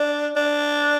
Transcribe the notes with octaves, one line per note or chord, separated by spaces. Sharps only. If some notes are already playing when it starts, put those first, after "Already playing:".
Already playing: D4
D4